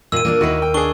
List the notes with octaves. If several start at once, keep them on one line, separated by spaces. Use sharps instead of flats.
A#2 D#3 A#3 E6 D#7
A#2 A#3 C4 D4
D#2 A#3 D#4 E4 F#4
G5
D4 G#4 C#6 G7